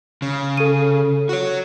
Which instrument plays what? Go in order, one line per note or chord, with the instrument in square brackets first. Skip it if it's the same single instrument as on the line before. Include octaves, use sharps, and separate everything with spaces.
[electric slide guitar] C#3
[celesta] A4 D#7
[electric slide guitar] F#4 C#5